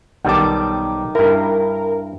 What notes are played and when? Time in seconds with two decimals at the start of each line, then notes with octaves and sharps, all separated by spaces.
0.25 B1 D#3 G3 A5 D6
1.15 G2 E4 A#4